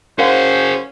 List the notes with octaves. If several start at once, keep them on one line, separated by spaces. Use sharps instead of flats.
C#4 F#4 G#4 A#4 C5 F5 F#5